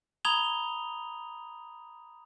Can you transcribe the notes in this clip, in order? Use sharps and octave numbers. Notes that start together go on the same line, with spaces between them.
A#5 B5 D#6 G#6 F7 G7